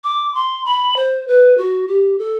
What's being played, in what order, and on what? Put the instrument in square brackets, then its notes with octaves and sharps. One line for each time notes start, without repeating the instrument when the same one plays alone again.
[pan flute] D6
C6
B5
C5
B4
F#4
G4
A4